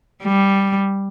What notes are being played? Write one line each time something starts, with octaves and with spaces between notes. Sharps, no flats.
G3